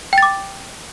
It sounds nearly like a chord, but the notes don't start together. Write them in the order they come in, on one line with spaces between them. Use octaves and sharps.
G5 A6 D6